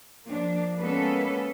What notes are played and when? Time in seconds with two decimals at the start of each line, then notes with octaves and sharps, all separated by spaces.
0.24 F3 A#3 D4
0.80 G#3 A#3 B3 C#4 A4 B4